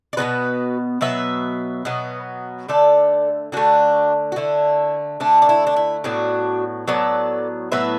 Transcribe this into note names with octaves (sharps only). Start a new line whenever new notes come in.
D5
B2 F#3 B3 F#4 B4
B2 F#3 B3 B4 E5
B2 F#3 B3
D3 A3 A4 D5
D3 A3 D4 F#4
F#4
D3 A3 E4
D3 A3 D4
D4
E4
D4
E4
A2 F#3 B3 D4 F#4
A2 F#3 B3 A4 D5
A2 F#3 B3 B4 E5